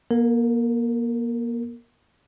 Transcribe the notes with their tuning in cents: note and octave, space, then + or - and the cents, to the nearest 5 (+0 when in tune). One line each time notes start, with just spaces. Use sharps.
A#3 +30 A#4 -25